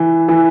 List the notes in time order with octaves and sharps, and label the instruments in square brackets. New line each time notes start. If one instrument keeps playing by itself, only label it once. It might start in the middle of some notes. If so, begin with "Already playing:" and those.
Already playing: [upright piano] E3
E3